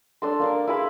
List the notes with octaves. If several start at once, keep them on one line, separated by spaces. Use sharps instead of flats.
D4 A4 C6
A#3 D4 A#4
E4 G#4 F5 B5